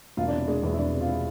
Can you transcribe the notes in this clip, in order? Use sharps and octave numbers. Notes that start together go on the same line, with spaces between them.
E1 F4
D4
C3 E4
G#3 D4
E2 E4
E4
E1 D4
C3
F4
G#3 E4